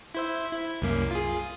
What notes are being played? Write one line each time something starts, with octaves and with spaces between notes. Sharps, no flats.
E4 C5 E5
E4
C2 F#2 A#3
F4 G#4